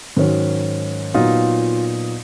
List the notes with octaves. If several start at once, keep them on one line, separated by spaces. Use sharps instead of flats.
G#2 D#3 F#3 C#4
A#2 F#3 B3 D#4 F4